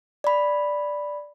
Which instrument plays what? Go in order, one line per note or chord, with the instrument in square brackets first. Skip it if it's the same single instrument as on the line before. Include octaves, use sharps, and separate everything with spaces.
[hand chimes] D5 B5